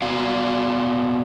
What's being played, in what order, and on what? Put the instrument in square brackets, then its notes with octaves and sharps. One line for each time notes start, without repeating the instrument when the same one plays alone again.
[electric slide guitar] B3 F#4 D5 F5